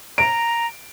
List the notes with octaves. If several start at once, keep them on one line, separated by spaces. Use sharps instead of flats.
A#5 D7